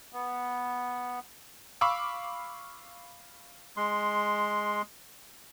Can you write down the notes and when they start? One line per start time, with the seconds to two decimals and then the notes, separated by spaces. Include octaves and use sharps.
0.13 B3
1.81 F5 B5 C#6 D6 E6
3.77 G#3 C6